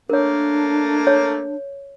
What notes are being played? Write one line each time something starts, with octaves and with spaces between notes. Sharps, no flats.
A3 A#3 D4 A#4 C#5
C#5